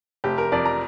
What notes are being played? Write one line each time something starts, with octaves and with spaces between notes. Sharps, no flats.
F1 G4
A#4
F2 D5
A#5